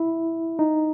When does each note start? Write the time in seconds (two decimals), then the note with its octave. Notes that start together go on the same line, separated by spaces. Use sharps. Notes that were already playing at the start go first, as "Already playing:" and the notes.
Already playing: E4
0.59 D#4